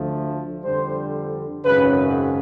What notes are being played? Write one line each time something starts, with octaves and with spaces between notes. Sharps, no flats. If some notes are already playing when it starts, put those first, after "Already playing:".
Already playing: D2 D3 F3 A3
F2 D3 G3 C5
G#1 F#2 C#3 B4